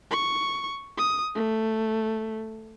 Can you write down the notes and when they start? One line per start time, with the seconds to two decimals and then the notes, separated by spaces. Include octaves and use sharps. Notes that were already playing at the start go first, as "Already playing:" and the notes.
0.11 C#6
0.98 D#6
1.35 A3